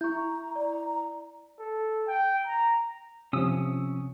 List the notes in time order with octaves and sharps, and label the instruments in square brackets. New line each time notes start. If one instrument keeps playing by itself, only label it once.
[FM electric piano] E4 [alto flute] A#5 [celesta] C#6 G6
[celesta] D5 [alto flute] A#5
[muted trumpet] A4
G5
A#5
[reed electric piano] C3 F3 [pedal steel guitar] C#4 D#6 E6